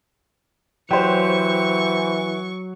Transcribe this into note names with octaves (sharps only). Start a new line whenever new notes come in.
E3 F#3 G4 C5 C#6